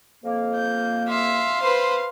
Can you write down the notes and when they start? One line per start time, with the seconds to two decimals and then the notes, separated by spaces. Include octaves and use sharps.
0.24 F2 A#3
0.56 G6
1.09 E5 F5 C6
1.62 B4 C5